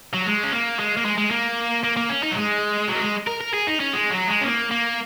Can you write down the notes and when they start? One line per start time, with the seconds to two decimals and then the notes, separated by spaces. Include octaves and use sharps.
0.14 F#3
0.26 G#3
0.44 C#4
0.53 A#3
0.79 G#3
0.97 A#3
1.05 G#3
1.18 G#3
1.31 A#3
1.84 A#3
1.97 A#3
2.09 C#4
2.23 D#4
2.32 F#3
2.36 G#3
2.89 F#3
2.96 A#3
3.01 G#3
3.27 A#4
3.41 A#4
3.53 G#4
3.67 D#4
3.80 C#4
3.93 G#3
4.10 F#3
4.28 G#3
4.41 C#4
4.45 A#3
4.71 A#3